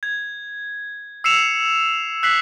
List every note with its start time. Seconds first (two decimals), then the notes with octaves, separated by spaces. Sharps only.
0.03 G#6
1.24 E6 C7 C#7 E7 F7
2.23 E6 F#6 B6 C7 F#7